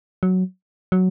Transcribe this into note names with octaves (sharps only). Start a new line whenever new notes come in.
F#3
F#3